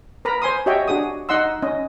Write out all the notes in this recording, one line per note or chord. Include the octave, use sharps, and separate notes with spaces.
A#4 B4 A#5 B5
C5 G#5 C6 D#6
F#4 G4 C#5 D#5 E5 G5
D4 F#4 G#4 D#6
D#4 D#5 F#5 C6 E6
C#4 D#5